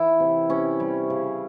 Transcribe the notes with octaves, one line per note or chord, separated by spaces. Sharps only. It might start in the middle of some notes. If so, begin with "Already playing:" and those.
Already playing: E3 E4
C3
C3 C#4
G3
C#3